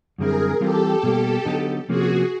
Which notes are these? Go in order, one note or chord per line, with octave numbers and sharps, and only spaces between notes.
F#2 D3 G3 C4 E4 G#4 A#4
E3 G3 C4 F4 G4 A4
B2 G3 A#3
D3 F#3 B3 D#4
C3 F3 A#3 C#4 F#4 G#4